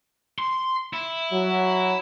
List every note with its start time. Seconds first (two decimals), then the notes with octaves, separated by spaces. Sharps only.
0.39 C6
0.94 E4
1.32 F#3